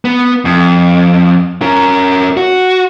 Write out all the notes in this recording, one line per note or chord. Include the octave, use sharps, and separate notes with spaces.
B3
F2
C#4 A#4
F#4